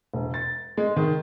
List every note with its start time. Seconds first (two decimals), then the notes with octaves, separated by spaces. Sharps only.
0.14 E1
0.34 A6
0.77 G#3
0.96 D#3